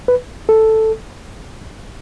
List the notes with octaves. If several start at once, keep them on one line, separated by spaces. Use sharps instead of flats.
B4
A4